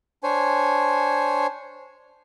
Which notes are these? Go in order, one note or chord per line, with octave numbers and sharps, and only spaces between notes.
D4 C5 C#5 G#5